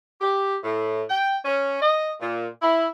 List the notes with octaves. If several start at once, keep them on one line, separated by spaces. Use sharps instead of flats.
G4
A2
G5
C#4
D#5
A#2
E4